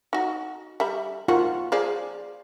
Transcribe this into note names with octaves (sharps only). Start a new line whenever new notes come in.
D#4 F#4
G3 E5 B5
D#3 F4 F#4
F3 G#4 D5